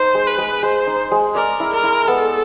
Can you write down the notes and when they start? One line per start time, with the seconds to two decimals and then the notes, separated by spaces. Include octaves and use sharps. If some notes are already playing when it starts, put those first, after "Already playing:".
Already playing: D#4 C5
0.15 G#3
0.27 B4
0.38 G#3
0.62 G#3 C5
0.87 D#4
1.12 G#3
1.35 A#4 D5
1.60 E4
1.72 A#4
1.83 E4
2.08 B3 A4